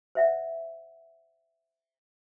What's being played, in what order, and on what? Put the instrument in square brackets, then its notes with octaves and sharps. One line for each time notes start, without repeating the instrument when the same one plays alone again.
[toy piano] C5 E5 F#5